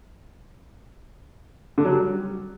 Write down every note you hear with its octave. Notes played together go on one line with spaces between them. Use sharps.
D3
F#3
G3